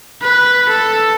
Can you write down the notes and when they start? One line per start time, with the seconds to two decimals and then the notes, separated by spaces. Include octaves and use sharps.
0.22 B4
0.69 A4